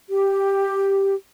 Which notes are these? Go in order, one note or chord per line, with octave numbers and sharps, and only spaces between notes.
G4